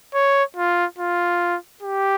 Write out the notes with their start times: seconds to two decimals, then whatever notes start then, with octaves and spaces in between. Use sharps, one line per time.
0.14 C#5
0.56 F4
0.98 F4
1.82 G4